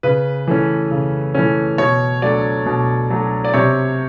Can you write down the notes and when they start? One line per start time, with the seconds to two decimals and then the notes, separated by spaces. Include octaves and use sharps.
0.03 C#3 B4
0.47 E3 A3 C#4
0.91 C#3
1.34 E3 A3 C#4
1.78 B2 C#5
2.22 F#3 A3 D4 D5
2.66 B2
3.10 F#3 A3 D4
3.45 D5
3.54 C3 C#5